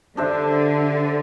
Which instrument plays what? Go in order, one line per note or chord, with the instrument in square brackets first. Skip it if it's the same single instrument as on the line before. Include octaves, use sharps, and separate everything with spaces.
[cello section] D3 [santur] D4 G4 C5 E5